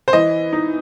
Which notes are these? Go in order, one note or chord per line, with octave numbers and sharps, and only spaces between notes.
C5
E3 D#5
D#4